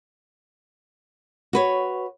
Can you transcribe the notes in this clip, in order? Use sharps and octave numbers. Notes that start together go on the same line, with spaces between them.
F#4 B4 C#5